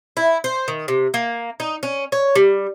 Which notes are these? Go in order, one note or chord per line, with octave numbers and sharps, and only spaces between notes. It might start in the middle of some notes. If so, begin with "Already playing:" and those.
E4
C5
D#3
C3
A#3
D#4
C#4
C#5
G3